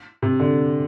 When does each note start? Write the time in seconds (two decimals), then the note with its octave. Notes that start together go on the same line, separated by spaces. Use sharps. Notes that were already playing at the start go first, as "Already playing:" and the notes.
0.22 C3
0.40 D3